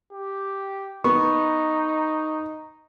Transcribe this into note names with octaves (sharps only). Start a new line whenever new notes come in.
G4
B3 D#4 C#6